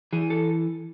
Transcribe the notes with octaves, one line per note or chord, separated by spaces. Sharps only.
E3 G#4
A4